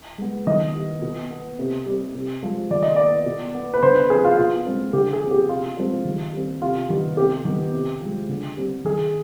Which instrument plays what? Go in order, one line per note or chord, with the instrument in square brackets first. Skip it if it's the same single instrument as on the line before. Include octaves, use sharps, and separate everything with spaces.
[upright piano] G#3 B3
D#3 D#5
G3 B3
B2
B3
C3
G3 C4
C3
F3 G#3
D#3 D5
D#5
B3 D5
B2
B3
B4
D3 C5
B4
F3 C4 G#4
F4
B2 F4
G#3 C4
D3 G4
G#4
F3 C4
G4
C3 F4
F3 G#3 C4
D#3
G3 C4
C3 F4
D#3 G3 B3
C3 G4
D#3 B3
C3
F3 G#3
D3
G3 C4
D#3 G#4